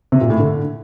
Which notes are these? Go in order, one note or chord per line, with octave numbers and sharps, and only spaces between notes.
C3
A#2
A2
D3